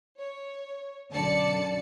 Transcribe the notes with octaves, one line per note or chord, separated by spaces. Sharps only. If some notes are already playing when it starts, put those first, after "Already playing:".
C#5
B1 F#2 D3 D5 A5 C#7